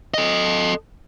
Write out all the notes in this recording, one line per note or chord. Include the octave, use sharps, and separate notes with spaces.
A4 D#5